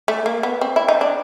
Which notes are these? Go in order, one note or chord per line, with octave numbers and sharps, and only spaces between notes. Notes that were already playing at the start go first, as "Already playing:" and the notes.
A3
A#3
B3
C4
E4
D#4
D4